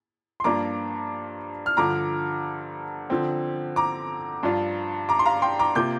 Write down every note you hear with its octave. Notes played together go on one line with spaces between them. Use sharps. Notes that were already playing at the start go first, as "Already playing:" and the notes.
C6
G2 F3 A#3 D4 F4 A#5 D6
F6
G2 D3 F3 A#5 D6
D3 F3 C4
A#5 D6
G2 F3 D4 F4
A#5 D6
C6
F5 A#5
G5 C6
A#5 D6
C3 A#3 F4 D6 G6